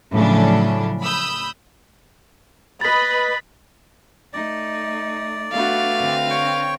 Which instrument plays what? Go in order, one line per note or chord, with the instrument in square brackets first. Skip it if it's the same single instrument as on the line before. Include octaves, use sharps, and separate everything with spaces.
[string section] A2 C#3 F3 F#3 C#4 D4
B5 D#6 E6 G6
[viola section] B4 D#5 B5 [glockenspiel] A6 B6
[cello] A3 D#4 [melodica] D5
[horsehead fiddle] A3 F#4 [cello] B3 D4 [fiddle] B4 F5
[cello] D3 C4
[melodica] C#5 G5 C#6